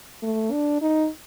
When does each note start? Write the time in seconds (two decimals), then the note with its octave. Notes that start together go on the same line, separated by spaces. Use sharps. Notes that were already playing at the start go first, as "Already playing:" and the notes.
0.23 A3
0.52 D4
0.82 D#4